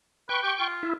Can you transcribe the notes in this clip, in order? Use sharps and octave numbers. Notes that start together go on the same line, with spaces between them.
B4 G5 C#6
G4
F4
E4